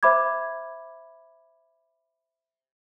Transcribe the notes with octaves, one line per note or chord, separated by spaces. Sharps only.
C5 E5 B5 D6 G#6